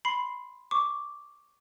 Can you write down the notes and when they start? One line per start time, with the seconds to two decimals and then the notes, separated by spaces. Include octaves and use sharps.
0.05 B5 C6 C7
0.71 C#6 D6